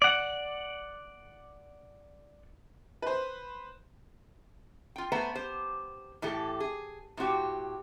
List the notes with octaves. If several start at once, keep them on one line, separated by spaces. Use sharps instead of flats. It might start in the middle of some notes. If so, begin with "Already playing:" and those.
D5 F#5
B4 C5
F4 G5
A3 B3 B4 C5 A#5
G4 C5
A2 E3 G4 A4
G#4
A2 C4 F#4 G4